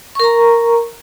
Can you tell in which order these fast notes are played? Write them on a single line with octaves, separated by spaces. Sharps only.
C#6 A#4 A#5